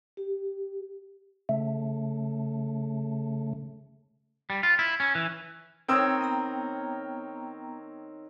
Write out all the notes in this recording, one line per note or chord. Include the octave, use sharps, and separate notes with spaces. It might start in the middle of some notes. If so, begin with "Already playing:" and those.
G4
C#3 A3
G3
F4
E4
C#4
E3
D#3 C4 A#4 C#5 D#6 E6
B3 G5 A#5